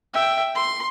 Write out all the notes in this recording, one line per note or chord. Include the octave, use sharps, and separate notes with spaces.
E5 G5
C6